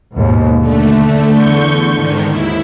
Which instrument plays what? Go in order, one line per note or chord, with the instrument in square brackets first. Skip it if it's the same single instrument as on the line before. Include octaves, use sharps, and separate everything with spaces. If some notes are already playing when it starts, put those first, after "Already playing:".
[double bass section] D#2 G#2 B2
[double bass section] D3 [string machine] A3
[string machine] E2 C#6 G6
G#2 D#3
D#2 E4